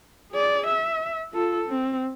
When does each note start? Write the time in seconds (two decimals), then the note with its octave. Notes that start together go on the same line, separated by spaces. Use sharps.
0.32 G#4 D5
0.67 E5
1.32 F4 A4
1.69 C4